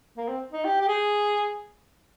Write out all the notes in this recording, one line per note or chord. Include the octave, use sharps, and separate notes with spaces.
A#3
C4
D#4
G4
G4
G#4